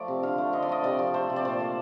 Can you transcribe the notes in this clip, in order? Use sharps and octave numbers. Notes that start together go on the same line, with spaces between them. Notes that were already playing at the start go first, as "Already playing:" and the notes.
Already playing: F3 A3 D5
C3
D3 F5
A3
D3 D#5
D5
A3 D#5
C3 D5
F3
A3 C5
C3
D5
A#2 C5
A3